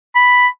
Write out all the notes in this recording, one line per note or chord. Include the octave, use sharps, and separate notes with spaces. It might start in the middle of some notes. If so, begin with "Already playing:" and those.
B5